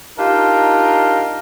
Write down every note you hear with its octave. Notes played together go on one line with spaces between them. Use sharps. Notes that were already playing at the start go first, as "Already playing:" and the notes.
D4 D#4 F4 G4 A#4